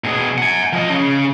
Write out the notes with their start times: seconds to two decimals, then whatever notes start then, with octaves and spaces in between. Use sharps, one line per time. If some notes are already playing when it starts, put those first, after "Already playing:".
0.04 B2 G#4
0.38 F#5 G#5
0.73 F3 D#5
0.90 C#3